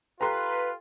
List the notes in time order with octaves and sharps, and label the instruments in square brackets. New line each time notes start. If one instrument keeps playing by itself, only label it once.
[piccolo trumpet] F4 [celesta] G4 A4 G5 [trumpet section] B4 [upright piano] A#5 C6